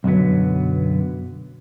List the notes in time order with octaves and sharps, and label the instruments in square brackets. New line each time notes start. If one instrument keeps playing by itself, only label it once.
[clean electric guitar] B1 F#2 D3 F#3 B3